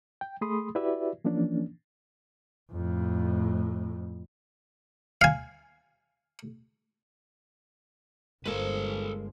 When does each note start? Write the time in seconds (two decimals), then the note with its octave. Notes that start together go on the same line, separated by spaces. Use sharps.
0.21 G5
0.41 A3 G#4 B5 C6 D#6
0.75 E4 F#4 G4 B4 D5 E5
1.25 E3 F3 A#3 C#4 D4
2.72 F2 A2
5.21 F5 G#5
8.46 G1 F3 G#3 A#3 A4 B4